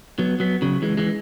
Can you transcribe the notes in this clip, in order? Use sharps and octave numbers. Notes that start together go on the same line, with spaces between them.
F#3 B3
F#3 B3
C#3 F#3
E3 G#3
E3 G#3